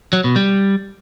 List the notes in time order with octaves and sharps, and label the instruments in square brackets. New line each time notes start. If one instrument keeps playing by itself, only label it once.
[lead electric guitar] F#3
B2
G3